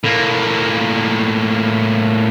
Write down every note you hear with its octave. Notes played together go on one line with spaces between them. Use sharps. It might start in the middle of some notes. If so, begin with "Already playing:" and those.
A2 A#3